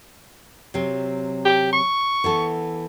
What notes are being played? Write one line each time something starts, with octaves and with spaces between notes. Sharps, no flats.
C3 F#3 C4
G4
C#6
E3 B3 A4